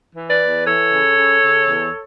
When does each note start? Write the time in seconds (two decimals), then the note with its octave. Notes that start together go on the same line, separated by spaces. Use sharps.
0.15 E3
0.28 B4 D5
0.41 E2
0.66 E3 A4 C#5
0.91 C#3
1.17 C#3
1.42 C#3
1.68 E2